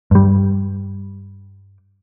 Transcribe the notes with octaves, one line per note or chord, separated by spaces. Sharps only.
G2 G3